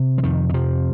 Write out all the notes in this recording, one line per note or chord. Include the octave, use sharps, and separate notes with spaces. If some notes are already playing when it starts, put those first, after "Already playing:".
Already playing: C3
F3
F2 D#3
D#3
C3 F3